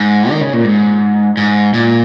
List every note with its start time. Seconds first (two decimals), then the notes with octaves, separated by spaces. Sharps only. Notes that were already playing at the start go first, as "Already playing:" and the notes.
Already playing: G#2
0.31 D#3
0.41 C#3
0.53 A#2
0.64 G#2
1.37 G#2
1.74 A#2